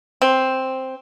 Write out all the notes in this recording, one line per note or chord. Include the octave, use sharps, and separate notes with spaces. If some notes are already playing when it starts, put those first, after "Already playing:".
C4